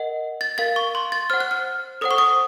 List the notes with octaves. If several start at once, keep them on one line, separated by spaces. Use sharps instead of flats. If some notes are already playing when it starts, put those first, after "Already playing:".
Already playing: A#4 D#5 F#5
A6
A#4 F5 A6
C#6
C6
A6
C5 F#5 F6
F#6
F6
A4 C5 F#5 D#6
C#6
D#6